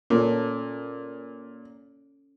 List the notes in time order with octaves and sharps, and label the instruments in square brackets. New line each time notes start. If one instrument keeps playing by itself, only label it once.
[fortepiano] A#2 [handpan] C#4 A4